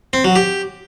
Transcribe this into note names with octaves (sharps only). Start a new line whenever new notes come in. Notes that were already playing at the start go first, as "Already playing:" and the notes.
C4
F#3
G4